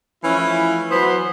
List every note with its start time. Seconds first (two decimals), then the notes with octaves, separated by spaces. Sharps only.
0.23 E3 F3 A3 C#4 E4
0.90 E3 F#3 B3 C5